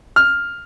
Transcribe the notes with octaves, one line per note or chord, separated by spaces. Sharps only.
F6